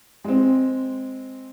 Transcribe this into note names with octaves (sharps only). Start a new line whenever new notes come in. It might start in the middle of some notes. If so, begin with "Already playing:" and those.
G#3 C4